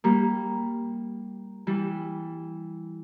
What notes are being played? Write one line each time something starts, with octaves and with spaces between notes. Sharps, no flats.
G3 A#3
E3 G3